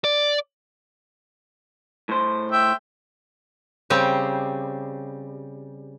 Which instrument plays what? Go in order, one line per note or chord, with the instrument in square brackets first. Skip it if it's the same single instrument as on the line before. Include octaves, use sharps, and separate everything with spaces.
[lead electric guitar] D5
[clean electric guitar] A2 C5
[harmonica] E5 G5
[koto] C#3 G3 C4